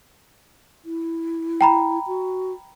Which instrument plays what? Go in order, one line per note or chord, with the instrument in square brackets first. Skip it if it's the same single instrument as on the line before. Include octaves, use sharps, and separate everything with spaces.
[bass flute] E4
[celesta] G5 A#5 B5
[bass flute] F#4